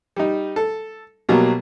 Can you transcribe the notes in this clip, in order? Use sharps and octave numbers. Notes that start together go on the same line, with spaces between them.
G3 D#4
A4
B2 F#3 G3 A#3